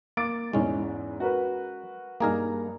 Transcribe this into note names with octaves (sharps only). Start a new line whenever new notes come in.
A#3 D6 A6 D7
E2 G#2 E3 G#3 C#4
F#4 A#4 B4
G2 A#3 D#4 G#4 A#4 A#5